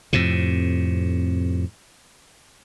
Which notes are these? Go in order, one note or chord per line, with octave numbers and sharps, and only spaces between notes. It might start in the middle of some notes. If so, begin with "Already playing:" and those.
F2 A2 C3